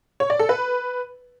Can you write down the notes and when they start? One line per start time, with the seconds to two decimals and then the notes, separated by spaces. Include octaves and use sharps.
0.20 C#5
0.30 D5
0.39 A4
0.49 B4